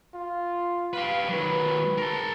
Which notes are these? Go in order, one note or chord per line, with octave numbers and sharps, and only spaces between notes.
F4
G4 B4 F5
D#3 F#3 B4
A#4 A5